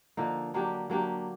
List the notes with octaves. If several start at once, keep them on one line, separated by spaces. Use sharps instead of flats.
D3 F3 A#3 D#4
F#3 A#3 D4 G4
F#3 A#3 D4 G4